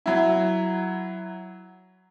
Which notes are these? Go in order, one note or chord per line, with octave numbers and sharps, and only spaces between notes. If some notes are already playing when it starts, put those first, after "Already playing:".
F#3 E4